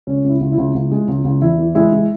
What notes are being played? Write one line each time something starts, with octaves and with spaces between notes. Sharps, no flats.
C#2 C#4
C#2
E4
C#2
E4
C#2
C#2
G#3
C#2
C#2
E2 E4
E3
G#3 E4
G#3